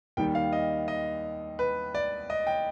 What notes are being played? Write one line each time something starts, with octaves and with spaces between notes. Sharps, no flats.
D#2 D#3 G3 G5
F5
D#5
D#5
B4
D5
D#5
G5